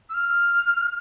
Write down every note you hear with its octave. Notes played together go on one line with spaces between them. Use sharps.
E6
F6